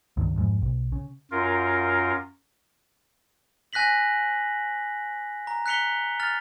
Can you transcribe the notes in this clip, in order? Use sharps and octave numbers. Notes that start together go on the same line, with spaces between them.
C#2 G2 D#3
F2 G#2
B1
C#3
F#2 F4 A#4
G#5 F#6 A#6 B6 F#7
A#5
F#6 B6 C#7 F7 G7
F6 A6 F7